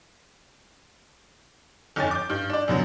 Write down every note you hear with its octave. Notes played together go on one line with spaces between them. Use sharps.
G1 F2 C#4 D#4 G#5 A6
D6 G6
G2 G6
D4 D5
F#2 B2 D3 F#3